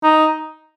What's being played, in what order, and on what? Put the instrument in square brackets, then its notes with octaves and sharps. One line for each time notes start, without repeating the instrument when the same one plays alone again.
[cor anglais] D#4